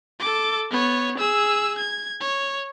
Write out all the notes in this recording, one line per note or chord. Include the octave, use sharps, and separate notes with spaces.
A4 D6
B3 C#5
G#4 E6
G#6
C#5